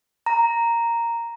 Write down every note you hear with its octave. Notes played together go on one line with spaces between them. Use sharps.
A#5